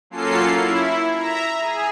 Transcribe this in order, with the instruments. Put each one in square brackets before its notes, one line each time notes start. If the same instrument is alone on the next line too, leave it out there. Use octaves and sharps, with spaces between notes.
[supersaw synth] F#3 A#3 C#4 F4 A4 C7
E4
E5 A#5
G#4